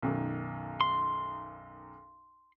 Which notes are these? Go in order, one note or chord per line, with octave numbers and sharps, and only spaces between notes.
B1 F#2 D#3
C6